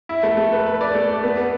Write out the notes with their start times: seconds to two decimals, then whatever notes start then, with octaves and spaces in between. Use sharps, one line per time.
0.09 E4
0.23 A3
0.37 A3
0.52 B4
0.66 B4
0.81 D5
0.95 A3
1.09 D5
1.23 B3
1.38 B3